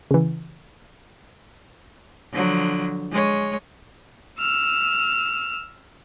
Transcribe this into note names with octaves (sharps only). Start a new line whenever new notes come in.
C#3 E3
D3 F3 F#3
G#3 C#5
E6 F6